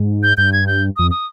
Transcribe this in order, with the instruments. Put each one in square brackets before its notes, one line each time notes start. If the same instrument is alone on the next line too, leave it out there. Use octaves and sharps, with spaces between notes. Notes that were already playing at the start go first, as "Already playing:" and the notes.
Already playing: [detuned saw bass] G#2
[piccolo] G6
[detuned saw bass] G2 [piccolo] G6
[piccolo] G#6
G6
[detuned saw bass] F2 [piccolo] D#6
[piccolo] D#6